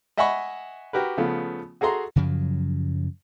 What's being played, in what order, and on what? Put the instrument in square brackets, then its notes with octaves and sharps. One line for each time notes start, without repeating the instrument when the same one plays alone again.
[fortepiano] D#5 E5 F#5 G#5 B5 C#6
F#4 G4 A#4 B4
C#3 F3 A3 B3
F#4 G#4 A4 A#5 C6
[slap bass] F#2 C#3 F3 F#3